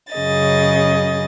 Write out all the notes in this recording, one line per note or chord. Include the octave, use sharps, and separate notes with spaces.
F#2 C#3 G#4 D#5 A6